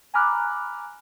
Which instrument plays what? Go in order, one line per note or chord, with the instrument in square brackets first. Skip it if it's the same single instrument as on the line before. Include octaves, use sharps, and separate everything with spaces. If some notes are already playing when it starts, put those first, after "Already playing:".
[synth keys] G#5 A#5 B5 D6 F6 F#6